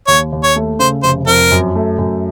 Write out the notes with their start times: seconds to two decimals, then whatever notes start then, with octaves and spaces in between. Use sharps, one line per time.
0.07 D#2 C#5
0.32 D#2
0.43 C#5
0.56 A3
0.79 C#3 C5
1.03 F1 C5
1.27 F2 A#4
1.52 F#2
1.75 A3
1.98 F#2